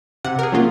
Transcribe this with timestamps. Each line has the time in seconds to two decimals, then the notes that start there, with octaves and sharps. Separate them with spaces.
0.25 C3 F#5
0.39 A#4
0.43 G#4
0.52 F#3 A#3 C#4 F4